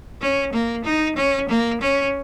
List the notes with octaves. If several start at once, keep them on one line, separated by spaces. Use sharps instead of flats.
C#4
A#3
D#4
C#4
A#3
C#4